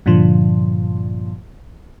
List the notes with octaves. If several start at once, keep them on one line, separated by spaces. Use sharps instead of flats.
G2 A#2 D3 F3